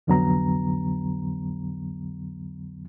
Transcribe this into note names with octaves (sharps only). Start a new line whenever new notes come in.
C2 F2 D3 F#3 B3 A#5